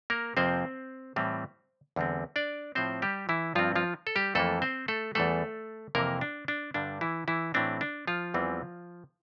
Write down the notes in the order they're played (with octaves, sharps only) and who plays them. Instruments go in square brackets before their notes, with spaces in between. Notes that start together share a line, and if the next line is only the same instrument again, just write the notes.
[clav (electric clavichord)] A#3 A#4
F2 C3 F3 A#3 C4 C5
A2 E3 G3 C4
E2 D3 G3 C4
D4 D5
A2 F3 C4 C5
G3 G4
E3 E4
G2 F3 C4 F4
F3 F4
A4
G3 G4
F2 E3 A3 A#3 A4
C4 C5
A3 A4
E2 E3 G3 A3 A4
F2 C3 E3 A#3 A#4
D4
D4
G2 D3 G3 D4
E3 E4
E3 E4
A2 E3 A3 C4 D4
D4
F3 F4
E2 E3 G3 C4